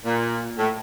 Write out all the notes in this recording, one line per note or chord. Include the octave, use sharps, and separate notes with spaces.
A#2
A2